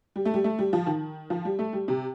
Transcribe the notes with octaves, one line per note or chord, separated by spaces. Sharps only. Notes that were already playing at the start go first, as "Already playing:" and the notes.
G3
A3
G3
A3
G3
F3
D#3
F3
G3
A3
G3
C3